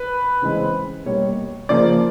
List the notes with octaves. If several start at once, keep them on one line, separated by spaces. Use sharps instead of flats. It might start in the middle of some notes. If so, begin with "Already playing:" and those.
Already playing: B4
C#3 E3 G#3 C4
B2 G3 A#3 C#5
C#3 F3 A#3 D5